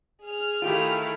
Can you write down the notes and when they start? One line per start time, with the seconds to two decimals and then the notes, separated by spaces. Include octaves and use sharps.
0.24 G#4 F6
0.62 D#3 A3 E4 F4 G4